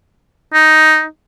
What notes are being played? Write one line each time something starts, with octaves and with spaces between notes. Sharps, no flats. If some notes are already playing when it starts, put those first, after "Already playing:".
D#4